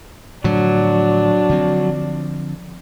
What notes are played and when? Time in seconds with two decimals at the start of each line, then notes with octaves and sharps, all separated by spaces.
0.44 A2 D3 F3 F#3 D4
1.49 D3 F3 C4